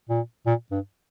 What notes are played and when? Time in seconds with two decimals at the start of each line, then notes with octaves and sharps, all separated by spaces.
0.09 A#2
0.46 A#2
0.71 G2